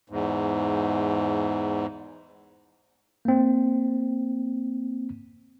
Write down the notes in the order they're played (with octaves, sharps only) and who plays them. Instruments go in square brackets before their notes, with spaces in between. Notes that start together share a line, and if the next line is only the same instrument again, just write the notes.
[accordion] E2 G#2
[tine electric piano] A#3 C4